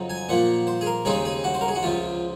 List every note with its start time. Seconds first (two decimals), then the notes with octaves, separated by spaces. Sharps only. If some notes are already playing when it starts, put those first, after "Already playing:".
Already playing: F2 C#3 F#3 C4 D#4
0.10 G#5
0.29 A#2 F3 A#3 F#5
0.67 C5
0.81 G#4
0.86 A#4
1.05 D#2 C#3 G#3 C4 D#4 G#4
1.25 G#4
1.44 F#4
1.54 C5
1.61 A#4
1.68 G#4
1.75 F#4
1.83 C#2 C3 F3 F4